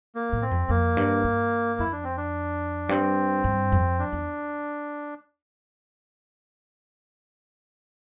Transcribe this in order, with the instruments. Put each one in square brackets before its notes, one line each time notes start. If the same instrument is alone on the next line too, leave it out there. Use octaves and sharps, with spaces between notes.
[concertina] A#3
[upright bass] A2
[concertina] C4
[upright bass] F2
[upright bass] F2 [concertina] A#3
[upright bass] G2
G2
[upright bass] F2 [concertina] E4
[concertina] D4
C4
D4
[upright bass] G2 [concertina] C4
[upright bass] G2
F2
[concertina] D4
[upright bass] E2